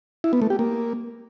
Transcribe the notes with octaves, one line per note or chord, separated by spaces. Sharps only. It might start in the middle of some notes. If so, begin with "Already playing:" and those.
E4
B3
A3
G4
A#3